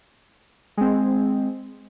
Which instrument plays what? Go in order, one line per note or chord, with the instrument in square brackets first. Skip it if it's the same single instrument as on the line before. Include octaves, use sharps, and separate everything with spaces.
[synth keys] G#3 C4